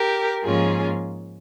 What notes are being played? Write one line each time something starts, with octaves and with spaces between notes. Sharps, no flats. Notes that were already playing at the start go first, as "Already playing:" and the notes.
Already playing: G4 A#4
G#2 F3 A#3 C#4 F4 G#4